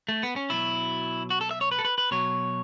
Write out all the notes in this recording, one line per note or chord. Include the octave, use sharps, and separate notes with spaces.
A3
B3
C#4
B2 F#3 E4
F#4
A4
E5
C#5
B4
A4
B4
B4
B2 F#3 C#5